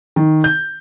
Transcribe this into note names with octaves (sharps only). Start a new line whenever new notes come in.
D#3
G6